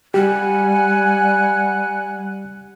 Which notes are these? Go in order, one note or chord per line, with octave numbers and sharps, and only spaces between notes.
G3 G4 F#5 G#5 F#6